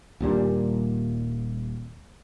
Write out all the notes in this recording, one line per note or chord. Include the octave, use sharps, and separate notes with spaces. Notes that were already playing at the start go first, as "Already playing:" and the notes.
D#1 A#2 G3 D4